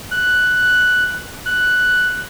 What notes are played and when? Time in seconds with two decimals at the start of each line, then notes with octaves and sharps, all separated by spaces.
0.11 F#6
1.46 F#6